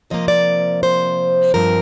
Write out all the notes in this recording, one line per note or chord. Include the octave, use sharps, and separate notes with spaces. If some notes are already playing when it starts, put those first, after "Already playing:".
C3 F3 A#3 D#5
D5
C5
G2 F3 C4 A#4